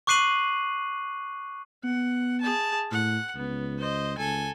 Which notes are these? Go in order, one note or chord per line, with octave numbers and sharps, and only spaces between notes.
C#6 D6 F#6 C7 D#7 F#7
B3 F#5
G#4 A5
A2 F#5
C#2 B3
C5 D#5
C#2 A4 G#5